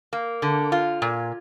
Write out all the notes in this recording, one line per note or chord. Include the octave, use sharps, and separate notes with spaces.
A#3
D3
F4
A#2